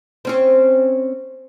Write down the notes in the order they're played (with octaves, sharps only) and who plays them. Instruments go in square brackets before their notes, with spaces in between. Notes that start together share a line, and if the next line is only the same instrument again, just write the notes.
[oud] C4 C#4 C5